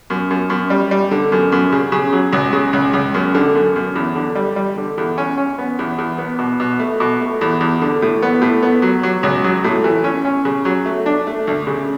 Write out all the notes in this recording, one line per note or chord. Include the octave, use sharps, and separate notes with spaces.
F#2
F#2
F#2
G3
G3
D3
F#2
F#2
C#3
C#3
F#3
C#2
C#3
C#2
C#2
F#2
D3
F#2
F#2
E2
D3
G3
G3
D3
E2
C#4
C#4
B3
E2
E2
B3
B2
B2
A3
B2
A3
E2
E2
D3
A2
B3
A2
B3
F#3
F#3
C#2
F#3
A2
E3
C#4
C#4
C#3
F#3
A3
D4
A3
D2
C#3